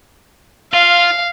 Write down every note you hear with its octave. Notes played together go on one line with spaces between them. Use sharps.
F4 F5